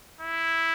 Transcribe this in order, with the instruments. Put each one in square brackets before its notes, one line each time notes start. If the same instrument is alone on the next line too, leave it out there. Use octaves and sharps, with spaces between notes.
[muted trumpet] E4